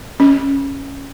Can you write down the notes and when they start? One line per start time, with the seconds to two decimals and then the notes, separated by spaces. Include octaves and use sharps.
0.20 C#4